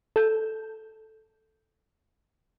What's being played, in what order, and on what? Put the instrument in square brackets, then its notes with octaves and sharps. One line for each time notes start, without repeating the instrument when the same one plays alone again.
[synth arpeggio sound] A4 G6